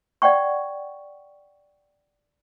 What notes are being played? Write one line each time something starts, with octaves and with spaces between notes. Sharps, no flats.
D5 F#5 G5 C#6